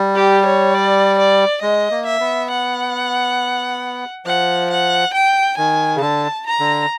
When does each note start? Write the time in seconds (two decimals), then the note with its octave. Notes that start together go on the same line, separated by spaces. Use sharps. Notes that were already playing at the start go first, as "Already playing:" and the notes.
Already playing: G3
0.15 G4
0.45 C#5
0.74 D5
1.18 D5
1.61 G#3 D#5
1.91 A#3
2.06 E5
2.20 B3
2.51 F#5
4.25 F3 F#5
4.70 F#5
5.14 G5
5.57 D#3 G#5
5.96 C#3
6.01 D3 A5
6.46 A#5
6.60 D3